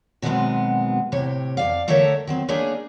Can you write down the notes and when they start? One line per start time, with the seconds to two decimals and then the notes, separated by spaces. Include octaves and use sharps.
0.22 B2 D#3 F#3 G#3 B3 C4
1.12 A2 C3 G4 C#5
1.57 F2 D5 F5
1.88 D3 A3 A4 A#4 C#5 E5
2.27 D#3 F#3 C4
2.48 A3 A#3 C#4 D4 G#4